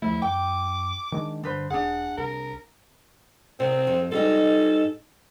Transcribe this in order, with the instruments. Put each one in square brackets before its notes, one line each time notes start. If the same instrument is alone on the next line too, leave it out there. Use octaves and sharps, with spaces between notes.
[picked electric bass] D#2 F3 A3 [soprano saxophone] E4
[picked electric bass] F#2 [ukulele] G5 [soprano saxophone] D6
[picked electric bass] D#3 G#3 D4
[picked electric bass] G2 D3 [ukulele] D4 B4 C5
[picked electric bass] E1 [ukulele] D4 G#4 [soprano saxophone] F#5
[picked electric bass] C2 [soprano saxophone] A#4
[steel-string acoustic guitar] C3 [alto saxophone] C4
[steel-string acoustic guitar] F2
[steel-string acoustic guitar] G#2 G3 D#4 [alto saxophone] A4